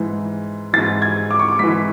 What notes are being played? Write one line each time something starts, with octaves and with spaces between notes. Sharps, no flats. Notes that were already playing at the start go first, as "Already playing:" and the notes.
Already playing: G#2 E3
G#2 E3 A6
G#6
D6
C#6
D6
G#2 E3 B6